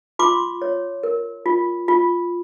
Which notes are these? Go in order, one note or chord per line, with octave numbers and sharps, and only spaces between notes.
F4 C6 D6
C#5
A#4
F4
F4